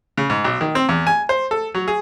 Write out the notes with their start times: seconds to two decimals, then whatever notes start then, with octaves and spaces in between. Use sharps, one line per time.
0.18 C#3
0.30 G#2
0.44 B1
0.61 D#3
0.75 C4
0.89 E2
1.07 G#5
1.29 C5
1.51 A4
1.75 F#3
1.88 G#4